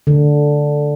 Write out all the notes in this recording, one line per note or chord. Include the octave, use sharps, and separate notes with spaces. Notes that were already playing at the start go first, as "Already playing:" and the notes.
D3